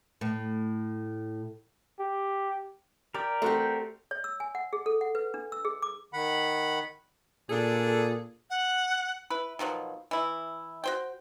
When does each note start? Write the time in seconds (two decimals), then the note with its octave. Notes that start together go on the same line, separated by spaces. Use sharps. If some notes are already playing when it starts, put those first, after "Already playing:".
0.21 A2
2.00 G4
3.14 G4 A#4 D5
3.42 A3 C4 F#4 G4
4.11 C#5
4.24 E6
4.40 G#5
4.55 F#5
4.73 G#4
4.86 A4
5.01 F#5
5.15 B4
5.34 D4
5.52 E6
5.65 G#4
5.82 D6
6.13 D#3 F#5 B5
7.50 A#2 D4 G#4 A4
8.50 F#5
9.30 E4 B4
9.59 B2 D#3 F3 F#3
10.11 E3 E4
10.84 F#4 C5 G5